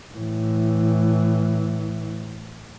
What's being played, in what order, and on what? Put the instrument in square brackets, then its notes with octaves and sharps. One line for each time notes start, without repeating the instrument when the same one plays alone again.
[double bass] A2 E3